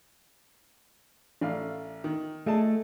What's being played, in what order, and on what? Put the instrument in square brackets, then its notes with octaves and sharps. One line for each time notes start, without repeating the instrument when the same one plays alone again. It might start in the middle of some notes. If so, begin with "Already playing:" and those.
[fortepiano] A1 D5 F5
D#3
[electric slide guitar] A3 [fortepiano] G#4 D#5 A5